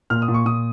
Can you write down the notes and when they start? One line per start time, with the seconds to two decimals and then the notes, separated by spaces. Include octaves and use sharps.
0.10 A#2 F6
0.22 D#6
0.28 A#2
0.34 C#6
0.45 A#2 D#6